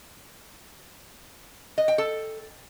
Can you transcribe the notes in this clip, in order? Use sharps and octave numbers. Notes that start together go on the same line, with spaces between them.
D#5
G5
A4